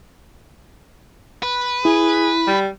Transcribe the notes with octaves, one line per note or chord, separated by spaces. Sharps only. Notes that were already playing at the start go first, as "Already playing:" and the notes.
B4
E4 G#4
G3